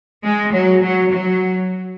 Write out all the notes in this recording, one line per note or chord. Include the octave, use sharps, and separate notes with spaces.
G#3
F#3
F#3
F#3